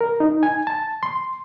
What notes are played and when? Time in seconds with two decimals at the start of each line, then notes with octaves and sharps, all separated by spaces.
0.01 A#4
0.20 D#4
0.43 G#5
0.67 A5
1.03 C6